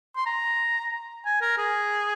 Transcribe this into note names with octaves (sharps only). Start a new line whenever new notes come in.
C6
A#5
G#5
A#4
G#4